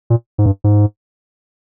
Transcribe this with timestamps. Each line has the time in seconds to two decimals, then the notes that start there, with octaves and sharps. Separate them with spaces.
0.10 A#2
0.38 G#2
0.46 G2
0.64 G#2